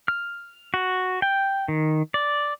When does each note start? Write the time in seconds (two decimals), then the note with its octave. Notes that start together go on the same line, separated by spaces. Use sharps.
0.08 F6
0.74 F#4
1.22 G5
1.68 D#3
2.14 D5